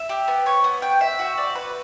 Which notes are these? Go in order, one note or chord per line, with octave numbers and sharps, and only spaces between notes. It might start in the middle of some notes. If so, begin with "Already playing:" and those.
Already playing: E5
G4
B3
C#5
B3
G5
E5
F#4
D5
B4